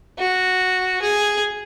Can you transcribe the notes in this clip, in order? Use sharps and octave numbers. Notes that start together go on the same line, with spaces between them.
F#4
G#4